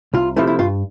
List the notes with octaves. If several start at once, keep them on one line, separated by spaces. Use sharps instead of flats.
C2 F4
C3 F3 A3 E4
E4
G2 F4